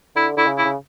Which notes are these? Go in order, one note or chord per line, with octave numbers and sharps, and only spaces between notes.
D3 E4
D3 E4
C#3
E4
C#3